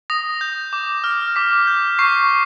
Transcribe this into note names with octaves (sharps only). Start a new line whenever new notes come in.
D#6 A#6
G6
D6
F6
D6 B6
G6
C#6 C7